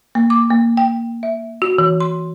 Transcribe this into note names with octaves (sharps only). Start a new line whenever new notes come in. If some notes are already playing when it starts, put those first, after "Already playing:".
A#3
D6
A#3
G5
E5
F#4
E3
C6